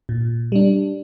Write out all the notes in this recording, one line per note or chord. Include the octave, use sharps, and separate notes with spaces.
A#2
G3 D4